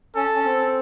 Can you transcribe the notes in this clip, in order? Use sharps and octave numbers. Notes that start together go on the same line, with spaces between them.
C#4 A4
C#4
C4